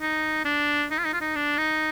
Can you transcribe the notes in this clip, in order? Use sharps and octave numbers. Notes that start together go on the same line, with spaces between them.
D#4
D4
D#4
F4
D#4
F4
D#4
D4
D#4